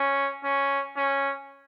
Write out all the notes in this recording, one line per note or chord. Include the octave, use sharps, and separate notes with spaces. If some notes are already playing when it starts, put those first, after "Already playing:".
Already playing: C#4
C#4
C#4